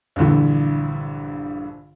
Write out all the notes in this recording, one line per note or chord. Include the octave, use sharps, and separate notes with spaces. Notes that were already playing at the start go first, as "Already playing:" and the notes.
A#1 G2 D3 E3